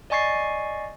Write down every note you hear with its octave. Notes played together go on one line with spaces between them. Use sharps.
D5 D#5 G#5 C#6 A6 C7